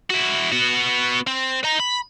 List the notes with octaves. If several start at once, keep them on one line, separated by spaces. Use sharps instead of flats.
E4 F#4
B3 F#4
C4
D#5 A#5
B5